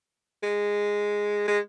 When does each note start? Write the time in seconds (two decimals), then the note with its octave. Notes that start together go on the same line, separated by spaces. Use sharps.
0.43 G#3
1.48 G#3